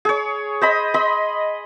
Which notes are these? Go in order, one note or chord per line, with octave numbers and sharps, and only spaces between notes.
G#4 C#5
C5 D#5 B5
D#5 B5 C6